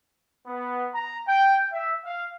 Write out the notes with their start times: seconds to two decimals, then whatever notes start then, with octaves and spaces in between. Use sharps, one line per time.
0.47 B3
0.93 A#5
1.28 G5
1.73 E5
2.05 F5